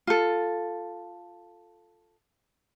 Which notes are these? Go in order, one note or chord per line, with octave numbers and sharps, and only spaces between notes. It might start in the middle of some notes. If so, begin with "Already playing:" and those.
F4 A4